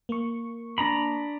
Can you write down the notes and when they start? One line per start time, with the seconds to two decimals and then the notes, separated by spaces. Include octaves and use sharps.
0.09 A#3 C#6
0.78 D4 A#5 B5